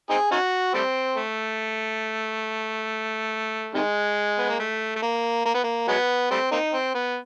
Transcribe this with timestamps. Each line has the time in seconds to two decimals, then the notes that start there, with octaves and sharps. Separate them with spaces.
0.10 C4 D#4 G#4
0.31 C#4 D#4 F#4
0.74 G3 A3 C4
1.16 A3
3.74 C3 D#3 G#3
4.38 B3
4.49 A#3
4.59 A3
4.95 A3
5.02 A#3
5.45 A#3
5.55 B3
5.64 A#3
5.88 F#3 G#3 B3
6.31 G3 A3 C4
6.51 A#3 C4 D#4
6.74 C4
6.95 B3